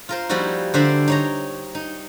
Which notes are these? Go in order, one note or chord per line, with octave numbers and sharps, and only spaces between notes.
F4 A#4 C5
F3 G3 A#3 D#4 E4 F#4
D3 D4 C5 D5 E5 A#5
D#4 C#5 A#5
D#4